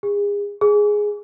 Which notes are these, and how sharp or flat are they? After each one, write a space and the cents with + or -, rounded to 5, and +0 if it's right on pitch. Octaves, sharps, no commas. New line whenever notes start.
G#4 -35
G#4 +0